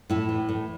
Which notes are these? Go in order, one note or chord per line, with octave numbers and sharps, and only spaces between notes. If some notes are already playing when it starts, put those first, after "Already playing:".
A2 E4
E3
A2